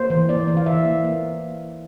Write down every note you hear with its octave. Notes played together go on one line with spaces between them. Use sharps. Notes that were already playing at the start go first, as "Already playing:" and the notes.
Already playing: A#3 C5
E3
A#3 D5
E3
F5
E3 E5
A#3
A#3